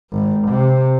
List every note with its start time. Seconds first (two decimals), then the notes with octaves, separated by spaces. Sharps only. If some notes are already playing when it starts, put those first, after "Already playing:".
0.12 G#1
0.49 C3